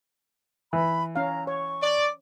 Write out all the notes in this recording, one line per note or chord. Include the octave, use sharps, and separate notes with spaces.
E3 B5
C#4 F5 A#5
C#5 C#6
D5